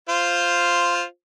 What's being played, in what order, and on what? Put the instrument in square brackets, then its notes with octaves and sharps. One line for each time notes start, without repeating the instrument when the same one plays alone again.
[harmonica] F4 C5